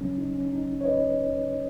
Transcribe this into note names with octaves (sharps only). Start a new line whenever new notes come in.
C#3 F#3 C#4
D#4
C#4
D#4
C#5
B4 D#5